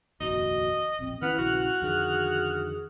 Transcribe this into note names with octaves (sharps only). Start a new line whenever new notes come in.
F1 A#1 D#2 F#4 D#5
E1 A#1 C4
D#3 B3 C#4 E4 F6 F#6
A#1 C#3 F#4
F2 D3 D#3 G#4